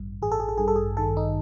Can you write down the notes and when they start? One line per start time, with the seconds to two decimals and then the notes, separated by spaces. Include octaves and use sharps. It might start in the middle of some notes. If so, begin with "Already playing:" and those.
Already playing: A1 G2
0.22 A1 G#4
0.32 A4
0.40 G#4
0.49 A4
0.58 G2 G#4
0.68 A4
0.76 G#4
0.97 D#3 A4
1.17 D#4